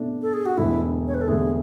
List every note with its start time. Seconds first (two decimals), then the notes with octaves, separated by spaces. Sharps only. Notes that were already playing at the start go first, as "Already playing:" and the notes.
Already playing: B2 A3 D4
0.22 A4
0.33 G#4
0.46 F#4
0.57 E1 D2 D3 E4
1.08 C#5
1.14 B4
1.21 A4
1.28 E1 D2 D3 G#4